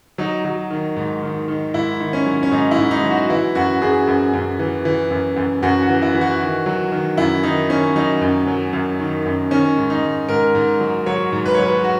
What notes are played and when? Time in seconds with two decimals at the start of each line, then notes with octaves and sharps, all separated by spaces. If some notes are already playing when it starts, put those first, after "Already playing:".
0.18 F#3 D#4
0.45 F#3
0.70 D#3
0.96 G#2
1.23 D#3
1.48 D#3
1.74 G#2 E4
2.00 D#3
2.13 C#4
2.26 F#3
2.43 C#4
2.51 G#2 D#4
2.71 E4
2.78 G#2
2.91 D#4
3.03 F#3
3.10 F#4
3.30 E3 E4
3.55 F#2 F#4
3.81 F#2 G#4
4.07 F#2
4.33 F#2
4.59 E3
4.85 E3
5.11 F#2
5.36 F#2
5.62 F#2 F#4
5.82 F#4
5.89 E3
6.02 E4
6.15 E3
6.21 F#4
6.41 D#3
6.66 F#3
6.92 D#3
7.17 F#2 E4
7.43 D#3 D#4
7.70 D#3 C#4
7.96 F#3 D#4
8.21 F#2
8.47 F#3
8.73 F#2
9.00 D#3
9.25 F#2
9.51 D#3 C#4
9.77 G#2
9.90 D#4
10.02 G#2
10.29 G#2 A#4
10.55 G#2
10.80 F#3
11.06 F#3 C#5
11.32 G#2
11.46 B4
11.54 C#5
11.59 F#3 B4
11.84 F#4